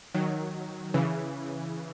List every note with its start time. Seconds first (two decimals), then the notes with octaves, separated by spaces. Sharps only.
0.14 D#3 F#3
0.94 C#3 E3